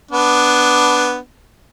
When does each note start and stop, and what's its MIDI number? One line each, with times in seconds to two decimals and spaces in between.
0.11 1.18 59
0.11 1.18 62